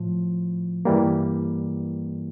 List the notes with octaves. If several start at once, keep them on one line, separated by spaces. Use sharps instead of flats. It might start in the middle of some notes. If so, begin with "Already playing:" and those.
Already playing: A2 F3
G2 E3 G3 A#3